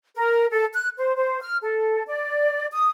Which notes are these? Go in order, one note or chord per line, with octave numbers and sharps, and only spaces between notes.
A#4
A4
F#6
C5
C5
F6
A4
D5
D#6